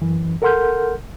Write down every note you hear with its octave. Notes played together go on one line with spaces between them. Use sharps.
F#2 E3
A4 A#4 F#5 C6 F6 G6